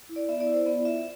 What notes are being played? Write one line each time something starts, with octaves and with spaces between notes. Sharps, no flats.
E4
D5
B3 E5
D5
E4
C5
B3 D5
F4 E5